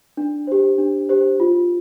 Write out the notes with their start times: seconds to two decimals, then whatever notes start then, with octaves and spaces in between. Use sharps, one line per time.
0.17 D4
0.47 G4 C5
0.78 D4
1.09 G4 C5
1.40 F4